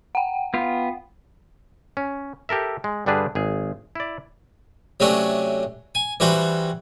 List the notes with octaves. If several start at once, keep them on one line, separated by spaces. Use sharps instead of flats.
F#5 G5
B3 F4
C#4
G4 A4 A#4 E5
G#3
G2 D3 G3 D4 G#4 B4
G#1 G#4
E4 D5
C3 F#3 A3 C#4 D4
G#5
E3 G3 D4 F#4 C5